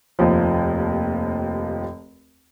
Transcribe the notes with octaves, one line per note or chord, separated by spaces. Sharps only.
F1 D#2 F3